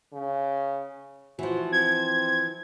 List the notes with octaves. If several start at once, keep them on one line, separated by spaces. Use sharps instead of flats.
C#3
E3 F3 F#4
C4 G#6